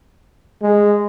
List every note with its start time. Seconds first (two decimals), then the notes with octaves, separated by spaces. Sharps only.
0.63 G#3